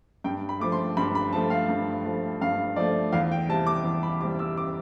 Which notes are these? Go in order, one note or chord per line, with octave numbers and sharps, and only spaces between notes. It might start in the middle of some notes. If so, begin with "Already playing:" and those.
G2 G5
B5
F3 A3 D6
C6
G2 B5
B5
F3 A3 A5
F5
G2
F3 A3
G2 F5
F3 A3 D5
E2 F5
G5
C3 G3 A5
D6
E2
B5
C3 G3 D6
E6
D6